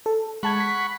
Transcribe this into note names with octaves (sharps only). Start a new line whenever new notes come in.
A4
G#3 F#5 A5 B5 C#6 G#6
B6